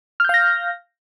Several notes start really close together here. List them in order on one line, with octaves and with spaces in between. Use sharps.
F6 G6 F5 A#6